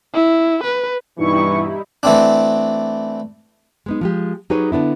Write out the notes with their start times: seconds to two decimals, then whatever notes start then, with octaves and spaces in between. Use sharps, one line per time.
0.14 E4
0.64 B4
1.18 G2 B2 E3 G3 D#4 E4 C#6
2.03 E3 A3 C4 D4
3.86 G#3 B3 D#4
4.01 F3 G#3 G4
4.50 F#3 D#4 G4 G#4 B4 C#5
4.72 D3 B3 D4 E4